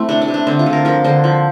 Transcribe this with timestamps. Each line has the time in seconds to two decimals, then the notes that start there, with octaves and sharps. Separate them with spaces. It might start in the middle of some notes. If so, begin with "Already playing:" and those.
Already playing: A3 C4 E4
0.09 C3 D4
0.22 D4
0.28 C3
0.34 D4
0.47 D3 C4
0.59 F4
0.66 D3
0.73 A#4
0.85 F3 A#4
1.04 D3 C5
1.24 F3